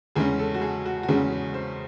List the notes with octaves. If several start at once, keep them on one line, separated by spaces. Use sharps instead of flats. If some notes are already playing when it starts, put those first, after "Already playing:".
E2 C#3 G#3 C#4 G#4
A4
F#4
G#4
F#4
F#4
E2 C#3 G#3 C#4 G#4
C5